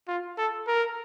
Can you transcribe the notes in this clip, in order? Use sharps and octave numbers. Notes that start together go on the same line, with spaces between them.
F4
A4
A#4